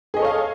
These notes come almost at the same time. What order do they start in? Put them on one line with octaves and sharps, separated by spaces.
G#4 D#5 A4 C#5 F5